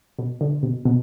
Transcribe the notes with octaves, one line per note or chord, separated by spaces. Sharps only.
B2
D3
B2
B2